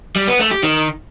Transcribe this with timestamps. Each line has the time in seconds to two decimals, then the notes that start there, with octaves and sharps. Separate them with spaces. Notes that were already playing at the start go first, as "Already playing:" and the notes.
0.16 G3
0.28 B3
0.39 A3
0.51 G4
0.63 D#3